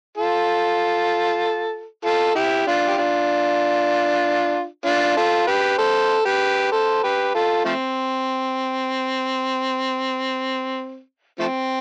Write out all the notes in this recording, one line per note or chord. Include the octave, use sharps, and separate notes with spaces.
F4 A4
F4 A4
E4 G4
D4 F4
G4
D4 F4
D4 F4
F4 A4
G4 B4
A4 C5
G4 B4
A4 C5
G4 B4
F4 A4
F3 A3 C4
F3 A3 C4